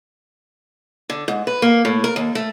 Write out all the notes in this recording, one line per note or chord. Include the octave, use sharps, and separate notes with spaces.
D3
G#2
B4
A#3
A2
A#4
D#2
A3